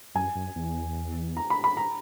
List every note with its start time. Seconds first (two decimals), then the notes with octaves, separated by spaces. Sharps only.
0.15 F#2 G#5
0.35 F#2
0.56 E2
1.37 A#5
1.50 B5
1.64 B5
1.77 A#5